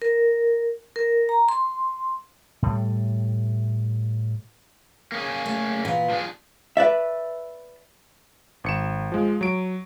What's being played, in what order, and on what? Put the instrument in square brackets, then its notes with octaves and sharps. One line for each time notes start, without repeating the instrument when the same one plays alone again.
[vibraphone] A#4
A#4
A#5
C6
[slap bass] A2 G3
[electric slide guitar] A#3 C#4 G#4
[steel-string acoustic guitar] A3
A#2 E3 B3
[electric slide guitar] F3 D4 G#4
[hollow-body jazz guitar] B4 D5 E5
[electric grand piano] G#1 C#7 E7
F3 G#3
F#3 D7